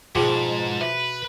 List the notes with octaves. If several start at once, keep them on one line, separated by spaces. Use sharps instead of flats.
G#2 B2 F3 G#4 G5 D6
B4 E5